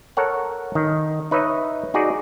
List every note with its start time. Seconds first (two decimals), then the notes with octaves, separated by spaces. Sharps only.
0.17 A4 A#4 C#5 F#5
0.75 D#3
1.31 D#4 B4 C#5 D#5 E5
1.94 D#4 F#4 G#4 D5